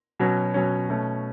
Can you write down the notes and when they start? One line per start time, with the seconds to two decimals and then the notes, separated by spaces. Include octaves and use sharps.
0.19 B2 F#3 C#4
0.54 B2 F#3 C#4
0.89 B2 A3 C#4